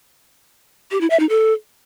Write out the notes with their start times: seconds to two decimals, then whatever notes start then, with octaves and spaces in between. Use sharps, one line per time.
0.91 G4
1.01 E4
1.10 E5
1.20 D#4
1.29 A4